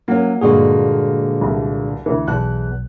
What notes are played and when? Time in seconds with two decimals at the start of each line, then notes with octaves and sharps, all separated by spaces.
0.08 F#3 A#3 C#4
0.41 G2 A#2 D3 G#3 F#4 G#4
1.41 C2
2.06 D2 E3
2.28 B1 E2 A5 F#6